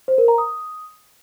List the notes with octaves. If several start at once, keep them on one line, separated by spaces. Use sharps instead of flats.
C5
A#4
A#5
D#6